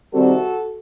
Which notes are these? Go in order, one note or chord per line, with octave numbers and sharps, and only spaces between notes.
C3 D#3 G3 C4 F#4 A4